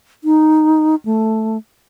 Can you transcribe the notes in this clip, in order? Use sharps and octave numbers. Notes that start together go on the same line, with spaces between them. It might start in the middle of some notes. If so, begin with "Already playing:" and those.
D#4
A3